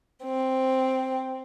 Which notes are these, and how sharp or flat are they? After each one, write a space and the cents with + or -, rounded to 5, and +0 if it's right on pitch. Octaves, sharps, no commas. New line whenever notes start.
C4 +0